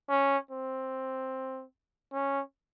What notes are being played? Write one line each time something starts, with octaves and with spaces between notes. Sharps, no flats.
C#4
C4
C#4